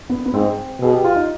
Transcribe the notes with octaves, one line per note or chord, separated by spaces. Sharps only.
B3
B3
G#2 C4
B2 G#4
G4
F4
D#4